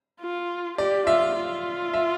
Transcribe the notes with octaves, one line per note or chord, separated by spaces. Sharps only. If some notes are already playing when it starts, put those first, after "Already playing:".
F4
G4 D5
F4 E5
F4
E5